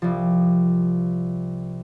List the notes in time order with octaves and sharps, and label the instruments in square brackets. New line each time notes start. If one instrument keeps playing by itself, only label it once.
[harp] C2 F3